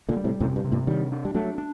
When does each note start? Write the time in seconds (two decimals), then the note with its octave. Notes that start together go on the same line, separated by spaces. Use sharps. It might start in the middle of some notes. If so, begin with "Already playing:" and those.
0.09 A#2 D3
0.16 G3
0.24 A2 C3
0.40 F#2 A2 C3
0.56 G2
0.64 C3
0.72 G2 A#2
0.87 D#3 G3 D4
1.12 D4
1.25 G3
1.35 F#3 A3 D4
1.58 D4